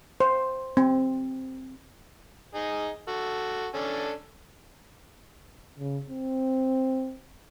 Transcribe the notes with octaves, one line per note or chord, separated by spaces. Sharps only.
C5
C4
D#4 G#4
F#4 A4
C#4 D4 A4
C#3
C4